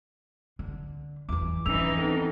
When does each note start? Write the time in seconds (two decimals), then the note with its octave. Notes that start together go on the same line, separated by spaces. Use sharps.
0.59 D3
1.29 E2 E3 D6
1.66 E3 C#4 D#4 E6 F7
1.98 B3 C4 A4